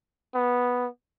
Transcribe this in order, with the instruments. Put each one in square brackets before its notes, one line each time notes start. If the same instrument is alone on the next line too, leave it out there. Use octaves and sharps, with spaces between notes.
[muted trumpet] B3